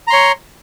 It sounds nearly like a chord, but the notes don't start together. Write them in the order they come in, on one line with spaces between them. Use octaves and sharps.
A#5 C6 C#5